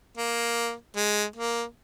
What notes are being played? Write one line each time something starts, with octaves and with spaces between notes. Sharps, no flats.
A#3
G#3
A#3